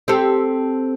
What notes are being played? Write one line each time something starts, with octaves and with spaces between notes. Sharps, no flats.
C4 G4 A4